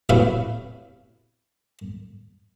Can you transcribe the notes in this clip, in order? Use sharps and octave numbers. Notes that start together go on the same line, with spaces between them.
A1 C3 F#3 B3 F#4 F5